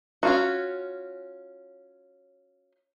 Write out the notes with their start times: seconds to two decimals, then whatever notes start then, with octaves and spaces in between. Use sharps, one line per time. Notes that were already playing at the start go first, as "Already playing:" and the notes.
0.23 C#4 F4 F#4